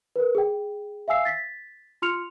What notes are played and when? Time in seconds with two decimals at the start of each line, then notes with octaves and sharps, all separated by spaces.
0.16 A#4 B4
0.35 G#4 G5
1.08 E5 F5 G#5 E6 C7
1.25 A6 B6
2.02 F4 C6 F6 C#7 F7